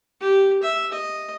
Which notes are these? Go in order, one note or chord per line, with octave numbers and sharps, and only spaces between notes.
G4
E5
D#5